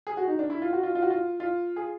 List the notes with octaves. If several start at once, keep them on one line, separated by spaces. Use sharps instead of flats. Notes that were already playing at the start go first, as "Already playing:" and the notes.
G#4
F#4
D#4
D4
E4
F4
F#4
F4
F4
F#4
F4
F4
G#4